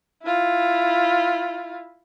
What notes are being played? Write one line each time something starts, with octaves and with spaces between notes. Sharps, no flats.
E4 F4